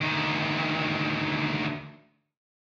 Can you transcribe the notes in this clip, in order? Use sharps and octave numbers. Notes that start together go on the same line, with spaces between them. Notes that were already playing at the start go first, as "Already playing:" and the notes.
D2 D#3